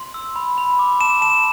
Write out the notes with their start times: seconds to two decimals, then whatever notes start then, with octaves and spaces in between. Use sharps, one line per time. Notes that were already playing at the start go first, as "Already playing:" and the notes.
Already playing: C6
0.14 E6
0.36 B5
0.58 B5
0.79 D6
1.01 A5 E7
1.21 A5 E7